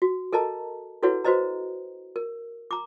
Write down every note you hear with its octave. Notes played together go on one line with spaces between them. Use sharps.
F#4
A4 A#4 D#5 A5 A#5
E4 F#4 A4 B4 C#5 F#5
F#4 B4 C5 D#5 A#5
A#4
A#5 D6